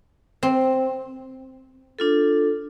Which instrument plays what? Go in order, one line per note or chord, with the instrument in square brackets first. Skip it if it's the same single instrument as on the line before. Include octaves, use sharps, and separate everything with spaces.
[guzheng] C4
[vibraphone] D4 F4 A4